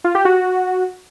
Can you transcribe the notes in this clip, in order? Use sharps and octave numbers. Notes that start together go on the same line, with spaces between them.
F4
G4
F#4